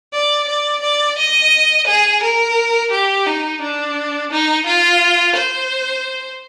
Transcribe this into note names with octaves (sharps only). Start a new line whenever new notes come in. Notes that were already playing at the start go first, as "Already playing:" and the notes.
D5
D5
D5
D#5
G#4
A#4
G4
D#4
D4
D#4
F4
C5